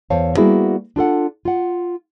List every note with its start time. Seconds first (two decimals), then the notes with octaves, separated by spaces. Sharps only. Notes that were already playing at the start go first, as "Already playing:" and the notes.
0.10 E2 C5 C#5 F5 A5
0.37 G3 A#3 B3 E4 F#4 G#4
0.96 D4 F4 A4 F#5
1.45 F4 F#5